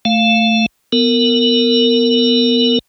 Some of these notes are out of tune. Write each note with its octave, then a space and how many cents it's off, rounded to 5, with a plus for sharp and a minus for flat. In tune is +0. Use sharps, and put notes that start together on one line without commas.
A3 +0 F5 +0
B3 +0 A#4 -25